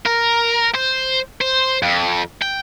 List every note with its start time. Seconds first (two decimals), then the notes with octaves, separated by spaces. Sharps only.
0.06 A#4
0.75 C5
1.41 C5
1.83 F2
2.42 G5